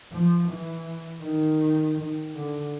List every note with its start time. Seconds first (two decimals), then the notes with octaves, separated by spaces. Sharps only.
0.12 F3
0.49 E3
1.23 D#3
2.35 D3